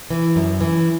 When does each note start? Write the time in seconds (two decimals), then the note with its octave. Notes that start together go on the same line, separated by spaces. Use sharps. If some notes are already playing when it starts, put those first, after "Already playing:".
0.10 E3
0.36 F#2
0.61 E3